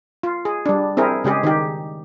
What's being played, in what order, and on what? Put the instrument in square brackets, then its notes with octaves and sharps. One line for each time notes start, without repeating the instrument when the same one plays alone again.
[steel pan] F4
G#4
G3 D4
C4 E4 G#4 A#4
C#3 G#3 G4 G#4
D#3 D#4 G4